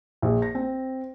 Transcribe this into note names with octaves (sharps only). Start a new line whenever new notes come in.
A#1
A#6
C4